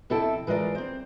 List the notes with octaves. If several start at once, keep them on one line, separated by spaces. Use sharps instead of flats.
F2 C3 E4 A4 G5 A5
E3 G#3 F4 A#4 D5
C4 C5